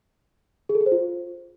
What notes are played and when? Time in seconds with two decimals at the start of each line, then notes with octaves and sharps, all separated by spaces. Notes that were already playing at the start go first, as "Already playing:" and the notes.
0.69 G#4
0.75 A4
0.81 G#4
0.86 C5
0.92 F4